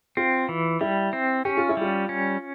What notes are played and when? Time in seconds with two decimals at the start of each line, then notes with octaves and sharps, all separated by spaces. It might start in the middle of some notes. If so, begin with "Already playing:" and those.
0.17 C4 F4
0.49 E3
0.81 G3 E4
1.13 C4
1.45 C#4 G4
1.57 F4
1.69 E4
1.77 G3 F4
2.09 C#4